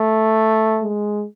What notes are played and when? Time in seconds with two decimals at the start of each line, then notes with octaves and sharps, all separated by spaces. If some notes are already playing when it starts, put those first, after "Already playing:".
Already playing: A3
0.80 G#3